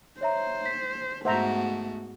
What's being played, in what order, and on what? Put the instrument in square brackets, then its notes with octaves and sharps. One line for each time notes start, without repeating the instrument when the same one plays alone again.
[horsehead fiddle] C5 [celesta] C#5 E5 A#5
[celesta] B6
[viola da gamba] G#2 B3 F#4 [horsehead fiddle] A3 [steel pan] C5 E5 A#5 [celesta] F#5